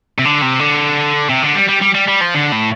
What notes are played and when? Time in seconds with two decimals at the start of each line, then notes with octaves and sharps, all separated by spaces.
0.18 C3
0.25 D3
0.42 C3
0.60 D3
1.29 C3
1.43 D3
1.56 G3
1.69 G3
1.82 G3
1.95 G3
2.08 G3
2.21 F3
2.34 D3
2.52 A2